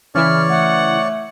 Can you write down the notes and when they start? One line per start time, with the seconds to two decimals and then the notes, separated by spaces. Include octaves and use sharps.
0.15 C#3 E3 E4 C#5 D5 F6
0.49 A3 F#5